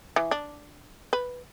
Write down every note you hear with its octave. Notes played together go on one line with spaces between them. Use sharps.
E3
D4
B4